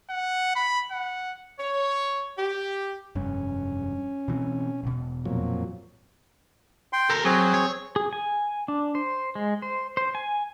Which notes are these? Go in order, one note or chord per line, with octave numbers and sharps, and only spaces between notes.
F#5
B5
F#5
C#5
G4
F1 G2 C#4
B2 E3 C4
E1 B2
F2 A#2 F#3
G5 C6
A4 A#4
F#3 C4 G#4
C#5
G#4
G#5
D4
C5
G#3
C5
C5
G#5